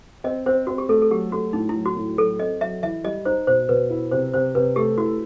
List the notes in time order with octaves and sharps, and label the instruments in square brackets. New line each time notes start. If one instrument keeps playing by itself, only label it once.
[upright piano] C4 [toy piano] D#5
[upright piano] C4 [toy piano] C5
[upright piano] C4 [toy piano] F#4
[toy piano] G4
[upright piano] A3 [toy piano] A4
[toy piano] A4
[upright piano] F#3 [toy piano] G4
[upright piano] A3 [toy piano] F#4
[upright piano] A2 [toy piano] D#4
[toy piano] E4
[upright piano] F#3
[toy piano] F#4
[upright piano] A2
[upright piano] F#3 [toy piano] A4
[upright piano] C4 [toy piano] D#5
[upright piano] F#3 [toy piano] E5
[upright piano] E3 [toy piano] E5
[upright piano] G3 [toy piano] D#5
[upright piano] D#4 [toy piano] C5
[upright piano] B2 [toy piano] C5
[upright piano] B2 [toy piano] B4
[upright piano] E4
[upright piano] C3 [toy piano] C5
[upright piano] C3 [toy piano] C5
[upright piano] C3 [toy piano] B4
[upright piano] A3 [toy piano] G4
[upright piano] E4 [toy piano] F#4